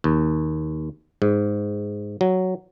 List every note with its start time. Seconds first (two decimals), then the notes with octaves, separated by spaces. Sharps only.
0.04 D#2
1.22 G#2
2.21 F#3